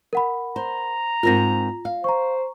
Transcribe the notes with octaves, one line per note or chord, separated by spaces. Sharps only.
A#4 F#5 B5
C5 A#5
G#2 C4 F4 A#4 A#6
F5
C5 A#5 C#6